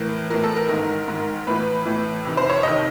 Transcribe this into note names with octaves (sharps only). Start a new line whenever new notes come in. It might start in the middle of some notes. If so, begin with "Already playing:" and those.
Already playing: A2 E3 A#4
A2 E3 A#4
A4
A#4
G#2 D#3 A#4
G#2 D#3
A2 E3 B4
A2 E3
F2 C3 D#3
C5
C#5
F2 C3 D#3 D#5